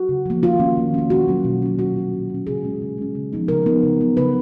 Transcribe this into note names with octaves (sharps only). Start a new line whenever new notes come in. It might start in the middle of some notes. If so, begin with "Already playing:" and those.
Already playing: F#4
C#3
F3 A#3
D#3 F4
A#3 C#4
D#3
A#3 C#4
B2 F#4
F#3 C#4
B2
F#3 C#4
A#2 F#4
F#3 C#4
A#2
F#3
C#4
C#3 G#4
G#3 C#4
C#3
G#3 C#4
C#3
F3 B3 D#4
C#3 A#4
F3 B3 D#4
C#3
F#3 B3
C#3 B4